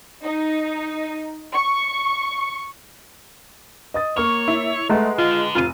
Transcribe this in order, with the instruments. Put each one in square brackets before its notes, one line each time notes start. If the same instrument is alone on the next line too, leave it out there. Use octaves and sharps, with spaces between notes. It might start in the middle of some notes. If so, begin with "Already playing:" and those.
[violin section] D#4
C#6
[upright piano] D#5 D#6 A6
[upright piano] A#3 C#6 F6 [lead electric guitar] C#5
[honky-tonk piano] E4
[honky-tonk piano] G#3 [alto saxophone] A3 [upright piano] B4 F#5 A#5
[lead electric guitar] D3 [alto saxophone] F4
[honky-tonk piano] F1 D#7 [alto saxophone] F4